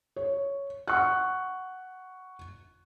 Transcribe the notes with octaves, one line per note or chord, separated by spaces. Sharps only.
C#5
F#5 C#6 F#6